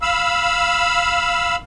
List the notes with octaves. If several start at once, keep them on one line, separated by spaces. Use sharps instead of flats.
F5 B5 E6